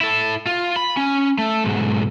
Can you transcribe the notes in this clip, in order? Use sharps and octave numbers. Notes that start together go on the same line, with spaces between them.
E4 A4
F4
B5
C#4
A3
B1 G#2